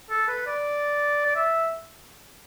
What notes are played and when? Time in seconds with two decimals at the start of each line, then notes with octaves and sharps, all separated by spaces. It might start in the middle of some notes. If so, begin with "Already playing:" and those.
0.10 A4
0.28 B4
0.47 D5
1.26 D5
1.36 E5